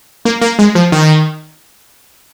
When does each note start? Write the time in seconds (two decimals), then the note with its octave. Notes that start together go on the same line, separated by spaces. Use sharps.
0.25 A#3
0.41 A#3
0.59 G#3
0.75 F3
0.92 D#3